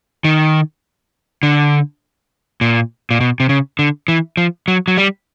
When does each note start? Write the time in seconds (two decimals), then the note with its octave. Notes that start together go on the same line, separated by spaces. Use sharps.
0.24 D#3
1.43 D3
2.61 A#2
3.11 A#2
3.21 B2
3.40 C3
3.49 C#3
3.79 D3
4.08 E3
4.37 F3
4.68 F#3
4.88 F#3
4.98 G3